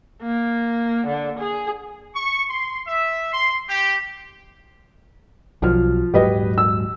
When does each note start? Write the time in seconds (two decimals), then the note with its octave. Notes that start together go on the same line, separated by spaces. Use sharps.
0.23 A#3
1.07 D3
1.39 G#4
2.16 C#6
2.50 C6
2.87 E5
3.33 C6
3.68 G4
5.62 B1 F3 F#3 F6
6.14 D#1 G#2 F#3 G4 B4 D#5
6.58 E6